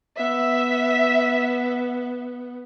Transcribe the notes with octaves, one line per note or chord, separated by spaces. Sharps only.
B3 E5